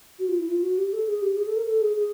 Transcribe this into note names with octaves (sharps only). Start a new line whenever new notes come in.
F#4
F4
E4
F4
F#4
G4
A4
G#4
G4
G#4
A4
A#4
A4
G#4
G#4